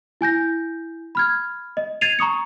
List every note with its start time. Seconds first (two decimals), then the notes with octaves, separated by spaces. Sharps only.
0.21 E4 G#5 G6 A#6
1.15 B5 F6 G#6
1.77 D#5
2.01 G#6 A6 C7 D#7 F7
2.19 A#5 C#6 D#6 C#7